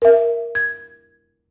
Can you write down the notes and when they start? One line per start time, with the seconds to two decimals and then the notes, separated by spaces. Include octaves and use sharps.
0.02 A#4 E5
0.55 G#6